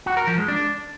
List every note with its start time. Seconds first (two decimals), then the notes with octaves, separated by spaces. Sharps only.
0.06 F#4
0.17 A#4
0.27 F3
0.38 G#3
0.48 D4